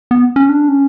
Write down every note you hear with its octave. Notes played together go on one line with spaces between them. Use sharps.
B3
C#4
D4
C#4